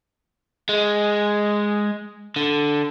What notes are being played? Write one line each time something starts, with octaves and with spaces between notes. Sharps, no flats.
G#3
D3